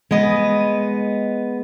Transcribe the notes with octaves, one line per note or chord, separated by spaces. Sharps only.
G#3 B3 D#5